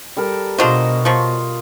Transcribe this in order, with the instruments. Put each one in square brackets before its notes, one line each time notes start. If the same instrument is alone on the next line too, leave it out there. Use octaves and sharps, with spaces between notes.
[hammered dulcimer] G3 A4 A#4
[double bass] B2 [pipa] D4 F4 C5 [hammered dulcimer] F#4 D#5 A#5
[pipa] F3 F#3 C#6 [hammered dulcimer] F4